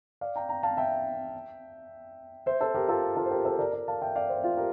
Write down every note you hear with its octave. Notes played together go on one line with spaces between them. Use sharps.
D5 F5
G5 A#5
G5 A#5
F5 A5
E5 G5
C5 E5
A4 C5
G4 A#4
F4 A4
F4 A4
C5
G4 A#4
A4 C5
A#4 D5
A#4 D5
F5 A5
E5 G5
D5 F5
C5 E5
F4
G4 A#4